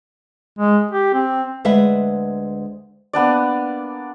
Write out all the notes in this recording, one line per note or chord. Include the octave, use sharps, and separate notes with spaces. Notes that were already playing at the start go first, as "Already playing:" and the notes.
G#3
G4
C4
D2 G#3 B4 E5 F#5
A#3 B3 D4 D5